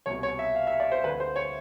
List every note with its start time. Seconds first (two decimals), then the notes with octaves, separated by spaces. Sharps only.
0.06 C2 B2 C#5
0.23 C#5
0.39 E5
0.55 F5
0.67 E5
0.80 D5
0.92 C5
1.04 D2 D3 B4
1.20 C5
1.36 C#5